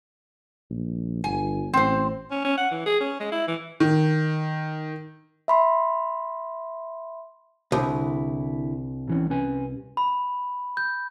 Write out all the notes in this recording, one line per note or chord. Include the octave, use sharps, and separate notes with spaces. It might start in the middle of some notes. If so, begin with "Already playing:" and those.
A#1
G1 G#5
A1 C4 C5
C#4
C#4
F#5
E3
G#4
C#4
G#3
E4
E3
D#3
E5 B5 C6
C2 D3 E4
C3 E3 C#4
C#4 B4 G#5
B5
G6